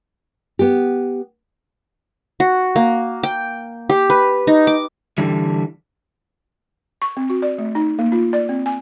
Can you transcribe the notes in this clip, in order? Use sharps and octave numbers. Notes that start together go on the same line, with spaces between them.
B3 G4
F#4
A#3
G5
G4
B4
D#4
D6
D3 E3 G3
C#6
C4
F#4
D5
A3
D#4
A#3
F4
D5
C4
G#5